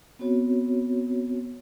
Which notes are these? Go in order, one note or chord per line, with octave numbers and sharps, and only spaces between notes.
B3 C4 F#4 C#5